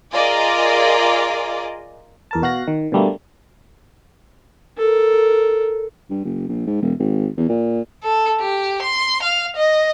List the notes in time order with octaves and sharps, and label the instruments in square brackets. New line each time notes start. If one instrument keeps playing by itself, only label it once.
[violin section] F4 G#4 A#4 D5 D#5 D6
[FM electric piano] E2 A#4 A5
B2 F#4 F5 F#6 A#6
D#3
B2 D3 G3 A3 A#3
[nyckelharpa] A4 A#4
[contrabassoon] G2
F#1
A#1
G#2
E1
G#1
E2
A#2
[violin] A4
G4
C6
F5
D#5